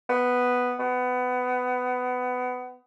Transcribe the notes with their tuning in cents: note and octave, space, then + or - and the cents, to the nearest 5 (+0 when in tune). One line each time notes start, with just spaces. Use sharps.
B3 +5
B3 +20